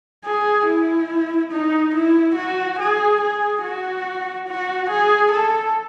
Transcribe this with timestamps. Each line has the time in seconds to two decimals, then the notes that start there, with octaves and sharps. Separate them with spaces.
0.25 G#4
0.67 E4
1.52 D#4
1.94 E4
2.35 F#4
2.79 G#4
3.21 G#4
3.63 F#4
4.48 F#4
4.90 G#4
5.32 A4